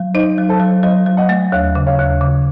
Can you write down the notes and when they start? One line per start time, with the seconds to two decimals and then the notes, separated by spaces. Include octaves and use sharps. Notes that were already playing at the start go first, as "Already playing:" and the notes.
Already playing: F#3
0.14 D#4 C5 D#5
0.38 F#3
0.49 A4 C5
0.60 F#3
0.83 F#3 C5 D#5
1.07 F#3
1.17 D#5 F#5
1.29 A3
1.52 D#2 C#5 F5
1.75 C#3
1.86 C#5 F5
1.98 D#2
2.21 C#3